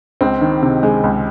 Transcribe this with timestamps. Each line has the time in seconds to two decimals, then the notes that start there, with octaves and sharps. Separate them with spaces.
0.21 C#2 C4
0.41 D#3
0.62 C3
0.83 G#3
1.04 C#2